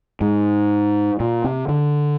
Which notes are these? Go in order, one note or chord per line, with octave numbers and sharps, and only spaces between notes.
G#2
A#2
C3
D3